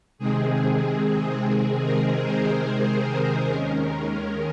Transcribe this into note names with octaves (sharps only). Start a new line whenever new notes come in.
C3 D#3 G#3 C4 G#4
A#4
C5
A#4
D#2 D#3 G#3 C#4